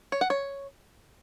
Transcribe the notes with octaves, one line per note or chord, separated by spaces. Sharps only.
C#5
F#5
C#5